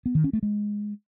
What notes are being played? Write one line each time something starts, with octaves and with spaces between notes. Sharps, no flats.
B3
D#3
C#4
A3
G#3